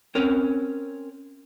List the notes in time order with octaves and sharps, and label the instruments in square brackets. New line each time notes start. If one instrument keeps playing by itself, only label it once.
[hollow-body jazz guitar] C4 C#4 A#4 C#5